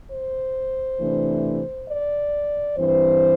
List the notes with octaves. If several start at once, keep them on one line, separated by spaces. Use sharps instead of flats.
C5
C3 E3 A3 D4
D5
G2 E3 C4 C5